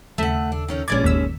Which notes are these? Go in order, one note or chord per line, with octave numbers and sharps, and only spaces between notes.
D#2 C#3 A3 E5 F#5 E6
D4
D#3 C#4 D#4
A#1 B2 G#3 C#4 D5 D6 G#6 A6
G1 D#2 A#3 E6 B6